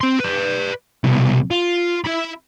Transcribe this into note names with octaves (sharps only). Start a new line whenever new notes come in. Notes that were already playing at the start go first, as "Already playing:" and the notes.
C4 C6
B4 D5
C2 B2
F4
E4 B5